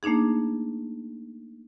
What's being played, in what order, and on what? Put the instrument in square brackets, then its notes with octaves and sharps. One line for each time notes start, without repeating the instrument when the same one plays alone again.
[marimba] A3 A#3 D4 D#4 G#4